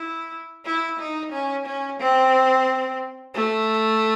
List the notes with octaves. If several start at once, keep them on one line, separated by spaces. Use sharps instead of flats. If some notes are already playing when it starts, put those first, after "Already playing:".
Already playing: E4
E4
D#4
C#4
C#4
C4
A3